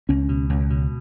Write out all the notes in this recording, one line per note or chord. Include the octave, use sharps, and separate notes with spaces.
C#2 C#4
B2
C#2
B2